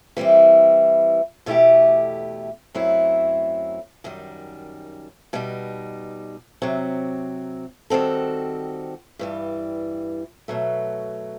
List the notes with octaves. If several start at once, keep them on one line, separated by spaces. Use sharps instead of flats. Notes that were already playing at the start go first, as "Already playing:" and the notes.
E3 G3 C4 E4
E2 B2 A3 E4 G4
F#2 F#3 A3 C4 E4
F#2 D#3 G3
B2 G3 D#4
C3 F#3 C4
D#3 G3 C4 F#4 A4
G2 E3 G3
B2 F#3 A3